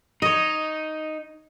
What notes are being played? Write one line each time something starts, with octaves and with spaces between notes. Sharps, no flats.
D#4 C#5 D#5